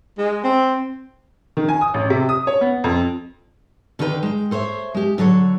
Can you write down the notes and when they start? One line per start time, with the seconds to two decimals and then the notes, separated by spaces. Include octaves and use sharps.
0.18 G#3
0.42 C4
1.57 D#3
1.69 G#5
1.81 D#6
1.94 A1
2.10 C3
2.29 D#6
2.47 C#5
2.61 B3
2.84 F2
3.99 D3 D#3 D4 B4 G5
4.23 G#3 G5
4.51 A4 C5 C#5 E5
4.95 G#3 G4
5.18 D3 F#3 A4 C#5